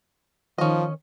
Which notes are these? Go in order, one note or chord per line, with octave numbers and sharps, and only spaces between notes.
D#3 F3 C#4 D#5